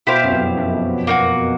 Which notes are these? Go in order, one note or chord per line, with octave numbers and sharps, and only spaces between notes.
B2 E4 G4 C5 F5
F#2
F2
F#2
A#3 D#4 F#4